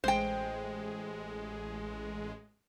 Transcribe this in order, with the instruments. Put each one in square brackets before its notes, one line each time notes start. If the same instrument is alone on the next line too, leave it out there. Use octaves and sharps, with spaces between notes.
[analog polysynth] A1 G#3 [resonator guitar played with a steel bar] C5 G5